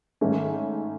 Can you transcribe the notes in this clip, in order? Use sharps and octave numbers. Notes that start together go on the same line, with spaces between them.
G#2 D#3 A3 C#4